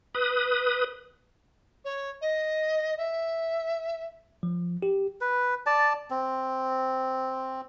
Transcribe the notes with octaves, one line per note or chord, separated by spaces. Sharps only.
B4 D#6
C#5
D#5
E5
F3
G4
B4
D5 A5
C4